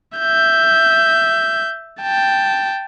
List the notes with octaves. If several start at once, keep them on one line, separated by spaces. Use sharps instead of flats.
E5 G6
G5 A5